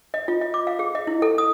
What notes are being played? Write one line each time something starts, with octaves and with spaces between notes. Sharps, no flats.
D#5
F4
D#5
D6
F5
G#4
D#5
E4
A4
D#6